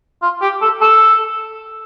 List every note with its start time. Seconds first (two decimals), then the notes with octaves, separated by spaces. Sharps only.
0.22 F4
0.42 G4
0.62 A4
0.81 A4